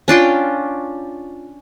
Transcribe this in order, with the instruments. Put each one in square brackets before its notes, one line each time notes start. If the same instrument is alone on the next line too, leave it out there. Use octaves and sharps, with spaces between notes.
[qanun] C#4 D4 F4 G5